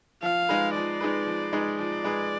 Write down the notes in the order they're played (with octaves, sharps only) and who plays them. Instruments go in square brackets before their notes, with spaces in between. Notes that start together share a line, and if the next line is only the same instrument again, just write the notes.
[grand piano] F3 [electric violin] F5
[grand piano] G#3 D#4 G#4 B4
[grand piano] F3 [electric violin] D5
[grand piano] G#3 D#4 G#4 B4
F3
G#3 D#4 G#4 B4
[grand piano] F3 [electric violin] D5
[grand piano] G#3 D#4 G#4 B4